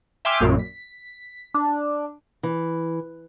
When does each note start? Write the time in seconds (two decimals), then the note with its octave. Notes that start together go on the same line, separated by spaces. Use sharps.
0.25 E5 G5 G#5 C6 D6 F6
0.41 A#1 F#2 A#2
0.59 B6
1.54 D4
2.43 E3